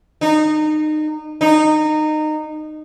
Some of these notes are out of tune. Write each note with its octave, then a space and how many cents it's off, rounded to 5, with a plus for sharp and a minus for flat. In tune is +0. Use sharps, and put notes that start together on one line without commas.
D#4 -25
D#4 -20